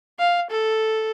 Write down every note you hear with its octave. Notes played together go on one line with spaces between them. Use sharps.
F5
A4